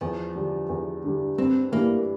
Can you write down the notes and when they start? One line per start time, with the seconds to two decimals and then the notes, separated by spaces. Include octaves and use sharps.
0.01 E2 F3
0.35 D3 G3 D4
0.69 E2
1.04 D3 G3 D4
1.38 G2 C4
1.72 E3 G3 A#3 D4